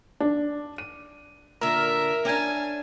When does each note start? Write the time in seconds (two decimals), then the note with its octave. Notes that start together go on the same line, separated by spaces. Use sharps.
0.20 D4
0.78 D#7
1.61 A#2 D3 A#4 E5
2.25 C#4 D4 G#5